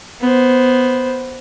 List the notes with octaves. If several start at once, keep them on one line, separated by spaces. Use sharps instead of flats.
B3 C5